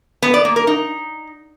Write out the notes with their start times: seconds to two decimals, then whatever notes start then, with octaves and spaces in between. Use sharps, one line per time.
0.22 B3
0.34 D5
0.45 A#3
0.56 A#4
0.67 D#4